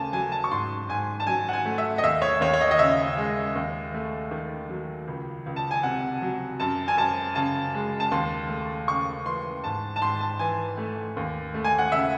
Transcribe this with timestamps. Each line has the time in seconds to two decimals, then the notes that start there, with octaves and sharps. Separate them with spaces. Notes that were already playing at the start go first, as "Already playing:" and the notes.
Already playing: D#2 C#3 A3 G#5 A5
0.13 F#3 G#5
0.32 A5
0.44 C#6
0.51 G#2 C6
0.89 G#2 G#5
1.20 A5
1.27 F#3 G#5
1.49 F#5
1.53 G#5
1.65 A3
1.78 E5
1.98 D#5
2.03 D#2 E5
2.22 C#5
2.41 D#2 C#5
2.53 C#5
2.61 D#5
2.71 D#5
2.79 C#3 E5
3.17 G#3
3.56 D#2
3.94 A3
4.31 D#3
4.69 F#3
5.07 C#2
5.46 C#2
5.56 A5
5.71 G#5
5.83 C3 F#5
6.22 F#3
6.60 F#2 A5
6.88 G#5
6.97 F#2 A5
7.35 C#3 A5
7.74 G#3
8.00 A5
8.11 D#2 C6
8.49 A3
8.87 C#3 C#6
9.26 E3 C6
9.64 G#2 A5
9.96 A5
10.02 G#2 C6
10.20 A5
10.39 E3 G#5
10.77 A3
11.17 D#2
11.54 A3
11.64 G#5
11.79 F#5
11.92 C#3 E5